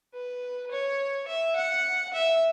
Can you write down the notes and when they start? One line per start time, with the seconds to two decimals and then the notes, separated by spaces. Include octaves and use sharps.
0.14 B4
0.71 C#5
1.27 E5
1.56 F#5
2.13 E5